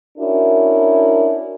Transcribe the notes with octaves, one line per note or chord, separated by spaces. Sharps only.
C#4 D4 E4 F#4 A#4